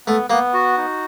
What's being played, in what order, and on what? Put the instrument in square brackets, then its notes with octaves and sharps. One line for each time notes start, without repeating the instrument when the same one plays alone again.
[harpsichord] A3 [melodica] B3
[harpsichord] A#3 [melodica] B3
[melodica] F#4
D#4